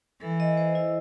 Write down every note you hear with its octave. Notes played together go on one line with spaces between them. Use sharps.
E3 A4
D#5
C5
E4